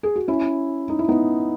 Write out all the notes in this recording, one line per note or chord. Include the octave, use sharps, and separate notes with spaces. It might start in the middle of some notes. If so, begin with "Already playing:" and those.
G#4
F#4
C#4 E4
D#4
E4
B3 D#4